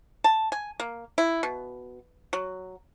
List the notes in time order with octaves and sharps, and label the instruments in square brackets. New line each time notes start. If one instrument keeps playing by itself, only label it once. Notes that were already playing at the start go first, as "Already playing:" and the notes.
[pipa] A5
G#5
A#3
E4
B2
F#3